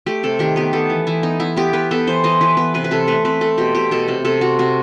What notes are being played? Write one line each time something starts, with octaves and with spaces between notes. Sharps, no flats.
A3 G4
C3 A4
D#3 G4
B3 G4
B3 A4
E3
E3 E4
B3 D#4
B3 E4
B3 G4
B3 B4
B3 A4
E3 C5
E3 D#5
E3 B4
B3 B4
C3 B4
B4
C3 A4
A3 B4
C4 B4
C4 A4
B2 G4
B2 G4
B2 A4
C3 A4
C3 A4
C3 F#4
C3 F#4